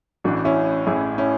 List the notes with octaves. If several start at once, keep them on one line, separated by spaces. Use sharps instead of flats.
A1 A2 E3 D4 F#4
C#4 E4
A1 A2 E3 E4 G#4
C#4 E4